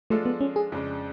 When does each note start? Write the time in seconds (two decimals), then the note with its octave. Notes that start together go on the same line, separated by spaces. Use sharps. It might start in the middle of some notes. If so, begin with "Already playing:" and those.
0.10 F3 G#3 A3 D4 F4 A4
0.25 B3
0.41 C#4
0.56 G#4
0.72 F2 C#3 G#3 D4